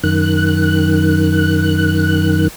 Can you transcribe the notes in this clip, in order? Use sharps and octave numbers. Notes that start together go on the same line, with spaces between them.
F#2 D#3 F#6